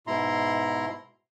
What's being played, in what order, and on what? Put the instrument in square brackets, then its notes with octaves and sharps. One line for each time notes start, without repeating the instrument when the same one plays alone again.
[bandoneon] G#2 B2 E4 A#5 C6